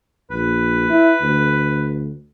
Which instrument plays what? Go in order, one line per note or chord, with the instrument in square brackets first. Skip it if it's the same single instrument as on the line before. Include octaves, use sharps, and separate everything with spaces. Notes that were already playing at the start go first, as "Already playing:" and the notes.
[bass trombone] A#1 [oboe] B4
[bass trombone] E4
D2